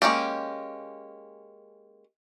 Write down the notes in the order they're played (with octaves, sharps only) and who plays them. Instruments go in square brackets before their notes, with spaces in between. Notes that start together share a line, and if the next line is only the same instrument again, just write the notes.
[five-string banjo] G#3 A#3 C#4 G4